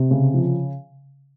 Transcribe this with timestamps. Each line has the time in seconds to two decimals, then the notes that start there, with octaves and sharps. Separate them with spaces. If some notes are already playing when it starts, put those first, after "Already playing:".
Already playing: C3
0.11 C#3
0.34 F3